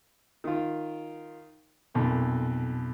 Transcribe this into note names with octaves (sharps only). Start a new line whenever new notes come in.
D#3 F4
B1 F2 A#2